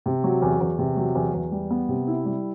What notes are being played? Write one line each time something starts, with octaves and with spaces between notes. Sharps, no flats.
C3
F#3
E2
E2
C3
F#3
E2
E2
G3
B3
C3
E4
G3